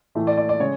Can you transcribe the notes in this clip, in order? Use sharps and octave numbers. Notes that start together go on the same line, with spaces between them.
A2 E3 A3
D5
D5
D5
C#3 G#3 C#5